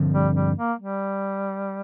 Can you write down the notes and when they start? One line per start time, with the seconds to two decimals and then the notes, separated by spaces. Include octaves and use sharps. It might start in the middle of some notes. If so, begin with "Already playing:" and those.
Already playing: G2 D3 F3 C4
0.13 G3
0.35 G3
0.57 A#3
0.79 G3